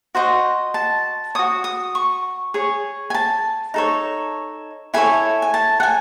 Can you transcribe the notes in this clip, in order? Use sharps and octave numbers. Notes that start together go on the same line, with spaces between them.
F#4 C5 D#5
A5
F#4 C#5 D#6
D#6
C#6
G#4 C#5
G#5
A5
D#4 A4 C#5
E4 A4 C#5 G#5
G#5
A5
F#5
G#5